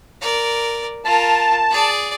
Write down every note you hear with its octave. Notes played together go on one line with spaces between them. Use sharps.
A#4 D5
F4 A#4 A5
G#4 D5